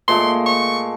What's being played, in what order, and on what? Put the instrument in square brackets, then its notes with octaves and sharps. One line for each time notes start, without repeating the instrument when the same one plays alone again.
[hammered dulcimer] A#2 G#3 A3 [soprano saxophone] C6
[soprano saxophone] C#6